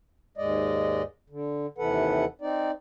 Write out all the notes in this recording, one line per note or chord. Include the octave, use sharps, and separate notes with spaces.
D#2 G#2 G#3 D5 D#5
D3
D#2 C3 E3 A4 B4 F#5
C4 D#4 D5